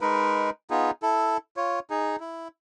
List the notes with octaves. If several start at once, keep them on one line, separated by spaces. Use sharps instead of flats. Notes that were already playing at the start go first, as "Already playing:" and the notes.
G#3 D#4 A#4 B4
B3 D#4 F4 G#4
E4 A4
F4 C#5
D#4 G#4
E4